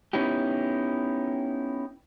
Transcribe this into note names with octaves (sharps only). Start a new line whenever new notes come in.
B3 C#4 D#4 E4 G4